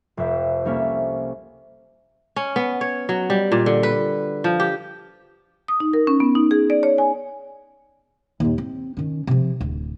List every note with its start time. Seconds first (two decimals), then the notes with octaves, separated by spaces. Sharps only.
0.17 F1 F2 E5
0.65 C2 A#3 C#4 A4 E5
2.36 C#4
2.56 B3
2.81 C#5
3.09 F#3
3.30 G3
3.52 A#2
3.66 D3
3.83 B4
4.44 F3
4.60 G4
5.68 D#6
5.80 D#4
5.93 A#4
6.07 C#4
6.20 B3
6.35 D#4
6.51 G#4
6.70 D5
6.83 C#5
6.98 G#5
8.40 D#2 A#2
8.58 C4
8.97 D#3 C#4
9.27 C3 F3
9.61 D1